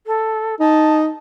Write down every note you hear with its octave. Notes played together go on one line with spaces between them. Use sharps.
A4
D#4 A5